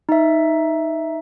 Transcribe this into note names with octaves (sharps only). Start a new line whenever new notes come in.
D#4 E5